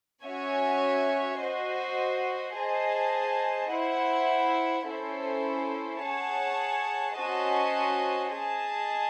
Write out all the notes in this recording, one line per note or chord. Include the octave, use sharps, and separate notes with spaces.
C#4 F#4 C#5 E5 G#5
F#4 C5 D#5
G#4 C5 D#5 A5
E4 C5 F#5
C#4 E4 A4 C5
G#4 C#5 F#5 A5
C#4 F#4 C5 D#5 A5
G#4 D#5 A5